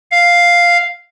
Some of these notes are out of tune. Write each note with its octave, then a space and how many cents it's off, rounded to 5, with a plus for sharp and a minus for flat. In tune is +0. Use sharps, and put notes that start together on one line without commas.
F5 +0